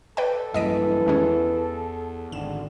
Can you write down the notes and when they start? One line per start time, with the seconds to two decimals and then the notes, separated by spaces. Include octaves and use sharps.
0.17 A4 B4 D5 G5
0.54 A#1 G2 E3 F#3 D#5 B6 D7
1.06 E2 D#3 G#3 C#4
2.32 G#1 D3 E7